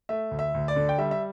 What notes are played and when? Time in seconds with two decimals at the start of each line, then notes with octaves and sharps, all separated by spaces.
0.09 A3 E5
0.31 D2
0.39 E5
0.54 D2
0.68 D5
0.76 D3
0.89 G5
0.98 G3 E5
1.11 E5